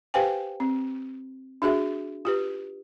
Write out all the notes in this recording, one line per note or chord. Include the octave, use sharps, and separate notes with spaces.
G4 B4 C5 F5 G5 G#5
C4
D4 F#4 G#4 E5
F4 G4 B4